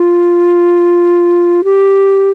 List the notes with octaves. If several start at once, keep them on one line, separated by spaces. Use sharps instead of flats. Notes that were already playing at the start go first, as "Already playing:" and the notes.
Already playing: F4
G4